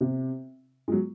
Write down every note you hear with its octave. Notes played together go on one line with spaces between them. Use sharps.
C3
G#3
F#3